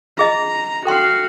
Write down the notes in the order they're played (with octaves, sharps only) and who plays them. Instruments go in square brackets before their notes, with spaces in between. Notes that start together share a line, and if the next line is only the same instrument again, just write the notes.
[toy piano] F4 G#4 D#5 [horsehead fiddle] A#5
[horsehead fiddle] F#4 F5 [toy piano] A4 G5 C6